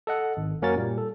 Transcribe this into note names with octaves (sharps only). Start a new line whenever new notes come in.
A4 D#5 F#5
G#1
F#2 A#3 C#4 F#4 A#4 A6
A#2 G3
A4